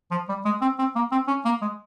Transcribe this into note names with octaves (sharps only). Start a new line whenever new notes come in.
F3
G3
G#3
C4
C4
A#3
C4
C#4
A#3
G#3